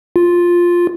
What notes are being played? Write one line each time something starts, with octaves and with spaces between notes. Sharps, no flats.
F4